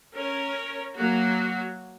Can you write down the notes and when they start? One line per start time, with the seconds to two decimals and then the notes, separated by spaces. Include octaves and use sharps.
0.14 C#4 A#4 C#5
0.94 F#3 A#3 F#4